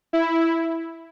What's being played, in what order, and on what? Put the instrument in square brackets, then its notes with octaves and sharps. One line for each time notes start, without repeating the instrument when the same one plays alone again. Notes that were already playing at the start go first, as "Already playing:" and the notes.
[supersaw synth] E4